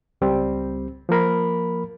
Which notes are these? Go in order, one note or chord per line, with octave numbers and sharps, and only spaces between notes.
C#2 G3 C4
F3 A#3 A#4 B5